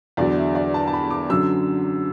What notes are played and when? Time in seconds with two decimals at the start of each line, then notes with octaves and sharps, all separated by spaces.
0.17 E2 D3 F#3 D5
0.37 E5
0.55 D5
0.74 A5
0.88 A5
0.93 B5
1.11 D6
1.30 F#2 D3 F#3 E6